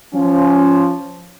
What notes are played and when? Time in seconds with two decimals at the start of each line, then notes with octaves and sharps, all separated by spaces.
0.14 F3 C#4